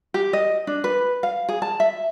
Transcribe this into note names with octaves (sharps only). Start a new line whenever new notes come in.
G4
D#5
D4
B4
F5
G#4
A5
E5